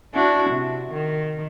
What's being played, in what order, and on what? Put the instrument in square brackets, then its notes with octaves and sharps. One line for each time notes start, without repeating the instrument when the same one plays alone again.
[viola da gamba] D4 E4 F#4
C3
D#3